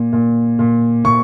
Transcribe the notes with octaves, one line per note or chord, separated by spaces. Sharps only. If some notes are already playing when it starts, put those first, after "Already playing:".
Already playing: A#2
A#2
A#2
A#2 C#6